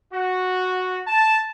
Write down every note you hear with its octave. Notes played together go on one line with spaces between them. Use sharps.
F#4
A5